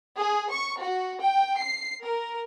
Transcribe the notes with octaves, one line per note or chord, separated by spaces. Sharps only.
G#4
C#6
F#4
G5
C7
A#4